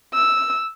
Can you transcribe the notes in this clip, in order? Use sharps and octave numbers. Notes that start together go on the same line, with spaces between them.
E6